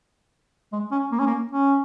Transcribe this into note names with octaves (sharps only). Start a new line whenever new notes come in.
G#3
C#4
A#3
C#4
A#3
C#4